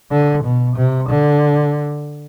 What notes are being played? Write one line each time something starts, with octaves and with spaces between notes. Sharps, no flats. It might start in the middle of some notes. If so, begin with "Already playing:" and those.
D3
B2
C3
D3